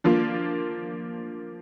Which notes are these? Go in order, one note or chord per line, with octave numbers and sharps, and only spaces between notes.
F3 A#3 D4 F4